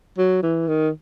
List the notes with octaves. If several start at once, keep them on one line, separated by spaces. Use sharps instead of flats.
F#3
E3
D#3